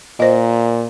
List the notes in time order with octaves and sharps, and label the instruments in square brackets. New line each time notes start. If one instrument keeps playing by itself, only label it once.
[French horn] A#2 [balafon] C5 D#5